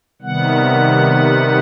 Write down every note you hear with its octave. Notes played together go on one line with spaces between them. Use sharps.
C3 D#3 G3 B3 F#5